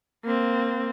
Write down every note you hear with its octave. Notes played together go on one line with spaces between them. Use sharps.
A#3 C4